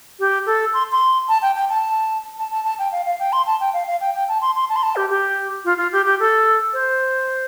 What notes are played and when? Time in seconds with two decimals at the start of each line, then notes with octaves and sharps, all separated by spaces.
0.20 G4
0.46 A4
0.74 C6
0.92 C6
1.29 A5
1.42 G5
1.56 G5
1.69 A5
2.38 A5
2.51 A5
2.65 A5
2.79 G5
2.92 F5
3.06 F5
3.20 G5
3.33 C6
3.47 A5
3.60 G5
3.74 F5
3.88 F5
4.01 G5
4.15 G5
4.29 A5
4.41 C6
4.56 C6
4.69 A5
4.76 C6
4.83 A5
4.96 G4
5.10 G4
5.65 F4
5.78 F4
5.92 G4
6.05 G4
6.20 A4
6.73 C5